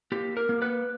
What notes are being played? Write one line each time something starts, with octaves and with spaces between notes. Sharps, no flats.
A#3 G4
A#4
A#3
B4